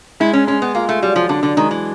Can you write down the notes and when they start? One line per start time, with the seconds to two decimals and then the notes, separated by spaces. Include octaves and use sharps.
0.20 G#3 E4
0.33 C#4
0.47 G#3 C#4
0.62 B3
0.75 A#3 F4
0.89 A3
1.02 F#3 G3
1.16 F3
1.29 D3 D4
1.43 D3
1.57 D#3 G#3
1.71 E3